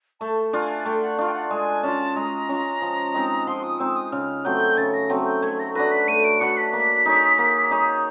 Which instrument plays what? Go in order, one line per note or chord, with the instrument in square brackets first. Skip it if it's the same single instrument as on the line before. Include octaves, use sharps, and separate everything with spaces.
[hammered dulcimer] A3 [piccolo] A5
[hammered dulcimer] D4 F4 [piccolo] G#5
[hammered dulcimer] A3 [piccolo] G5
[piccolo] F#5
[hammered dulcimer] D4 F4 [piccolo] F5
[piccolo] G5
F#5
[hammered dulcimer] G#3 [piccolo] G#5
[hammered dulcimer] C#4 F4 [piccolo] A5
[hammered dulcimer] G#3 [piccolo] A#5
[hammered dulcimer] C#4 F4
F3
G#3 C4 D#4
[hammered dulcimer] F3 [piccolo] C6
[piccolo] D#6
[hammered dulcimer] G#3 C4 D#4 [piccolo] E6
[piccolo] D#6
[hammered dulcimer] C#3 [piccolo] F6
[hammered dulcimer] F#3 A3 C4 [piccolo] G6
[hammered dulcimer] C#3 [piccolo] A6
[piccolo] A#6
[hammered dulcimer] F#3 A3 C4
[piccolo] G6
[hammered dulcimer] A3 [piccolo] G#6
[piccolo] A#6
[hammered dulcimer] D4 F#4 B4 [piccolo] A#6
[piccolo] B6
[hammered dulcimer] A3 [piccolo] D#7
[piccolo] D7
[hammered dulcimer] D4 F#4 B4 [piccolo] C#7
[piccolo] B6
[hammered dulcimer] A#3
D#4 G#4 C#5
A#3
D#4 G#4 C#5